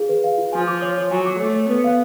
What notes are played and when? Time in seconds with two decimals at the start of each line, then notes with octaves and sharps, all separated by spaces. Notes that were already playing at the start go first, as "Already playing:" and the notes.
Already playing: F4 G#4 F5
0.09 B4
0.24 F5
0.38 F4
0.53 F3 G#5
0.67 D6
0.82 C#5
0.97 C#5
1.11 F#3 G#5
1.26 D6
1.40 A3 C#5
1.54 C#5
1.69 B3 B4
1.84 F5